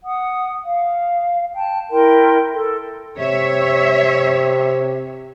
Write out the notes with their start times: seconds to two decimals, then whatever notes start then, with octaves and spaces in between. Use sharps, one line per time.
0.04 F#5 D#6
0.66 F5
1.55 G5 A5
1.91 E4 A#4 G5 C6
2.53 A4
3.19 C3 C#5 E5